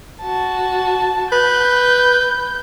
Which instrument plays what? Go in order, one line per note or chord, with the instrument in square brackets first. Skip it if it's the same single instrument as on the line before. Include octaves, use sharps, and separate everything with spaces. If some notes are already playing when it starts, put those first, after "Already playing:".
[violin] F#4 A5
[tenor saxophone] B4 [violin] G6